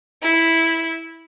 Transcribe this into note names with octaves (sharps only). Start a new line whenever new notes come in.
E4